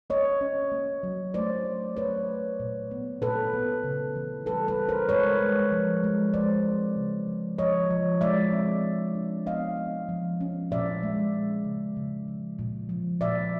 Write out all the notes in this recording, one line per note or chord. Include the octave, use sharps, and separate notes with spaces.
A#3 C#5 D#5
C#4
A#3
F#3
A3 C5 D5
F#3
F#3 B4 C#5
A3
A#2
B3
A#2 A4 B4
B3
C#3
E3
G3 A4 B4
A4 B4
G3
A#4 C5
G#3 B4 C#5
G#3
F3
G#3
G#3 C5 D5
C4
C#3
F3
F3 C#5 D#5
F3
G#3 D5 E5
C4
D4
D4
B3 D#5 F5
B3
F3
C#4
A#2 D5 E5
G#3
C#4
C#3
C#3
F3
A#2
F3
A#2 D5 E5